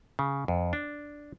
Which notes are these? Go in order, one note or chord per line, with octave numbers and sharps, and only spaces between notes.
C#3
F2
D4